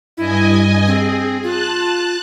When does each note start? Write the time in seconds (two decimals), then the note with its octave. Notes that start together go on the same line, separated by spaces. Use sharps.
0.17 G2 E4 D#5 G#5
0.87 C4 G#4
1.43 F4 A5 F#6